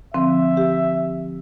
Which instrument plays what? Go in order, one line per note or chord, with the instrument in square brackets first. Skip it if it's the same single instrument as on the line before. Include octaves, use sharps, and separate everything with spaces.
[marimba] D3 F3 C4 [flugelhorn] E5
[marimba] G4